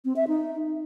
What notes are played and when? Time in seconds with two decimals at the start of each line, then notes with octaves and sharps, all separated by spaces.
0.05 C4
0.16 E5
0.28 D#4